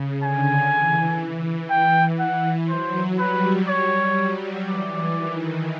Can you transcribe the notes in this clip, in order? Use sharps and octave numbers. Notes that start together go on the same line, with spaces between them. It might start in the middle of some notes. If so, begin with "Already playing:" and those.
Already playing: C#3
D3 G#5
E3
G5
E3 F#5
F#3 C5
G3 B4
C#5
F#3
E3 D5
D#3